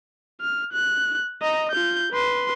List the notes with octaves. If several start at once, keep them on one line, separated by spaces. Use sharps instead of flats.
F6
F#6
D#5 A#5
F4 G6
B4 C6